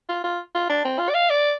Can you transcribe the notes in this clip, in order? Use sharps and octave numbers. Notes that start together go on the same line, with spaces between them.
F4
F4
F4
D4
C4
F4
D5
F5
D5